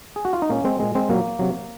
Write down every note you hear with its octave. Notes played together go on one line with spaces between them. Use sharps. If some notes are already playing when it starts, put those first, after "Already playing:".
G#4
F#4
F4
D#4
A#2 G#3 A#3 C#4
G#3 C4
A#2 G#3
G#3 C4
A#2 F#3 A#3
C3 F#3